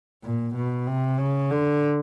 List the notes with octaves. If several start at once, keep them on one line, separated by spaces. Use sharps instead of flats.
A#2
B2
C3
C#3
D3